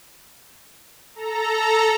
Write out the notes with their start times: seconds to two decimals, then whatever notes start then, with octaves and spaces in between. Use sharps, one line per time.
1.14 A4 A#5